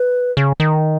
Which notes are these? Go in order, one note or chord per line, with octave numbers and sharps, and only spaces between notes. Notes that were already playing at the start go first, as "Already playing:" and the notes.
Already playing: B4
C#3
D#3